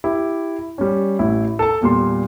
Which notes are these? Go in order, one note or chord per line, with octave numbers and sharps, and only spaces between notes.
E4 G4
G3 C#4
A1 E4
A4 A5
E2 A#2 G3 C6